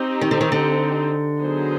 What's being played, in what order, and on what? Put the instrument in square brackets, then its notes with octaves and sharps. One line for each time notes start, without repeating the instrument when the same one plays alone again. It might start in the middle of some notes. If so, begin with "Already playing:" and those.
Already playing: [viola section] C4 D#4 G4
[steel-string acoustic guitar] D#3
D3
D#3
D3
[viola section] F#3 B3 D#4 G#4 C5